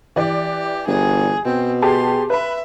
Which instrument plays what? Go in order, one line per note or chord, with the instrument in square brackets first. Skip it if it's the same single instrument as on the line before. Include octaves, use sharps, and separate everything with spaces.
[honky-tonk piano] E3 D5 [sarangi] G4
[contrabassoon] G1 [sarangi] G#4
[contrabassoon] B2 [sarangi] C4
[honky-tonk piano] G4 G#4 A5 [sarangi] C6
[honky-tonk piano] B4 B5 [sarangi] E5